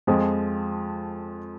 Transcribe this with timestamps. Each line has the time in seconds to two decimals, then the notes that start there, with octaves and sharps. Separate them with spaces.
0.07 F2 F3 G#3